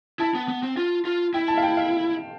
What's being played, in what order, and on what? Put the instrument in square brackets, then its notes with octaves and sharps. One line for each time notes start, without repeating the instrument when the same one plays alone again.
[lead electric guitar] E4 [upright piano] A5
[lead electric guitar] B3
B3
C4
F4
F4
[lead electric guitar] E4 [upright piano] G5
[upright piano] A5
F5
G5
F5